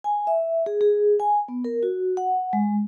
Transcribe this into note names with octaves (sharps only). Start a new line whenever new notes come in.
G#5
E5
G#4
G#4
G#5
B3
A#4
F#4
F#5
G#3